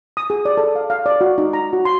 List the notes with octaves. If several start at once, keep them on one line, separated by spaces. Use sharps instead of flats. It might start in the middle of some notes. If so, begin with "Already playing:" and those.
D#6
G#4
D5
A4
F5
F5
D5
F#4
D#4
A#5
F#4
C6